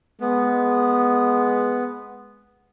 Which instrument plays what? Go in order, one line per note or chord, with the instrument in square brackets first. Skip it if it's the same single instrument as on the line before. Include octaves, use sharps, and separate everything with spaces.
[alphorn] G#3 [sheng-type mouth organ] B3